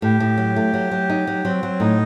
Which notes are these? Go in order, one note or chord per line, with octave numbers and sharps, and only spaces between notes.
A2 G4
A2
F#3
A3
F#3
F#3
D#4
F#3
F#3 C4
F#3
A2 D#4